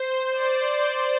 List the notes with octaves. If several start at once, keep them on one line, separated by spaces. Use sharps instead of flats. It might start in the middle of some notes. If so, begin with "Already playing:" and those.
Already playing: C5
D5